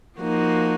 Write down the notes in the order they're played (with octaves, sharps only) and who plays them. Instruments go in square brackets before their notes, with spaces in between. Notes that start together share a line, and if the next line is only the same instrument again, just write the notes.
[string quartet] F3 A#3 D#4 F#4